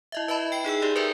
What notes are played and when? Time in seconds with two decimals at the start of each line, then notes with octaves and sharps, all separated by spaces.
0.12 E4 D#5 E5
0.28 B4 D#5 E5 A5 B5
0.52 G5 C7
0.65 D#4 G#4 G5 E6
0.82 D#4 G4 D5 E5
0.96 A#4 B4 D5 E5 A#5